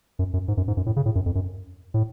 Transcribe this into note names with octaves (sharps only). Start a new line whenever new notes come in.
F#2
F#2
G#2
F#2
G#2
F#2
A2
C#3
A2
F#2
F2
F#2
A2